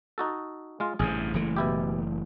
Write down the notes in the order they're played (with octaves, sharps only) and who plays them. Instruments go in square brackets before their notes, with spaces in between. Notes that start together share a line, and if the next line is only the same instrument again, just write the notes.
[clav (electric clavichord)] D#4 F#4 A4
G#3 F4
[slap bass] A1 G2 C3 [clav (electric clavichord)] G#4
[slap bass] F#1 E3 A3
[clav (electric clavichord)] B2 E4 G4